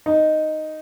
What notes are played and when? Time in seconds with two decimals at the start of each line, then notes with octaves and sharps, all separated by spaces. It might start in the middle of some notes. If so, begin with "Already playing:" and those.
0.06 D#4